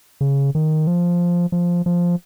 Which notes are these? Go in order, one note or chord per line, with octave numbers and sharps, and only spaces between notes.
C#3
D#3
F3
F3
F3